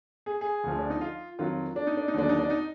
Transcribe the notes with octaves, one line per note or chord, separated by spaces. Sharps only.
G#4
G#4
D2 D3 F3
D4
D#4
F4
F2 D#3 F#3 F4
D4
D#4
D4
D#4
D#2 D3 F#3 D4
D#4
D4
D#4